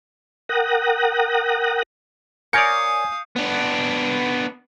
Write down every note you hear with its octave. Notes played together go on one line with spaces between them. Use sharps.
A#4 F#5 G5 D#6 F#6 A#6
A#4 C#5 D5 F5 G#5 D#6 G6 C#7
B3 D4